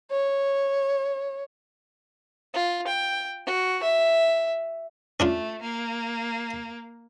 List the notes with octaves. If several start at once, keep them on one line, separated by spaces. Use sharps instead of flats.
C#5
F4
G5
F#4
E5
A3 C#4 D4 F4
A#3